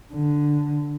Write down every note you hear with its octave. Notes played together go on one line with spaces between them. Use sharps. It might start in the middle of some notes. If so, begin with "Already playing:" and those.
D3